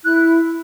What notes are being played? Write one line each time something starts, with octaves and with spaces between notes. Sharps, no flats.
E4 F#6